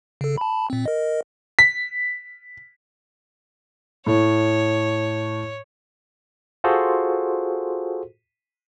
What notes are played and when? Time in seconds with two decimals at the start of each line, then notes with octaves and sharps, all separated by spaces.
0.21 C#3 A4
0.38 A5 B5
0.70 A#2 C4
0.86 A#4 D#5
1.59 B6
4.06 A2 C#5
6.64 F4 F#4 G#4 A4 C5